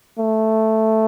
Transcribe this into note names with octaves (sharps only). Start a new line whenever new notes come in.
A3